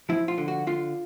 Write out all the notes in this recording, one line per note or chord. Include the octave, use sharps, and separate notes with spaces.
F3 E4
F4
D3
F#4
D3 F4